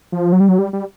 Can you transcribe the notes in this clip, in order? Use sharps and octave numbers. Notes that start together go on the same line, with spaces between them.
F3
F#3
G3
F#3
G3
G3